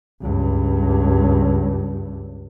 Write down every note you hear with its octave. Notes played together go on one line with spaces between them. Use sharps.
C#2 G2